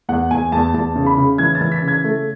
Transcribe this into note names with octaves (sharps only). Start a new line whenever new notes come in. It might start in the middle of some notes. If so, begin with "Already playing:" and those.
E2 F#5
E2 G#5
E2 A5
E2 A5
C#3
B5
C#3
E3 G#6
A6
E3
B6
C#3
G#6
A3